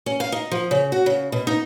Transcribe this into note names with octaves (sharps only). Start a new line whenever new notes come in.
C#4
F5
D#4
F3
C#3
F#4
C#3
B2
D#4